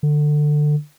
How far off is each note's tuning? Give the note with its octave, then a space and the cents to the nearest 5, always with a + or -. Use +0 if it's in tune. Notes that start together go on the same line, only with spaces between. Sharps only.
D3 +20